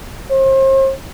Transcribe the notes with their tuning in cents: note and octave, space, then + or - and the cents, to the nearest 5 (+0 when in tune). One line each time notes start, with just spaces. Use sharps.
C5 +40